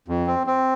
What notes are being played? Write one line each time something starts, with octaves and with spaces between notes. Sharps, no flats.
F2
C4
C4